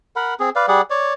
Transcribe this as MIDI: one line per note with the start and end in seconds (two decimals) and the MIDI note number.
0.16 0.34 70
0.16 0.34 78
0.16 0.34 83
0.40 0.50 60
0.40 0.50 68
0.56 0.66 71
0.56 0.66 74
0.56 0.66 77
0.68 0.81 55
0.68 0.81 68
0.68 0.81 74
0.68 0.81 78
0.90 1.13 73
0.90 1.13 74